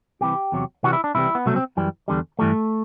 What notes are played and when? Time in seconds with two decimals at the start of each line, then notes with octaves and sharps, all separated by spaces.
0.21 C2 C3 E3 G4
0.52 E2 C3 F#3
0.83 C2 C3 E3 G3 F#4
0.93 E4
1.04 D4
1.15 C2 C3 E3 G3 E4
1.35 B3
1.46 C2 B2 F#3 A3
1.56 C4
1.77 F#2 E3 G3
2.08 E2 D3 G3
2.39 G2 E3 G3 A3